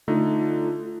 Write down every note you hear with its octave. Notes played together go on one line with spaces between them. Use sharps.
D3 A3 D#4 F4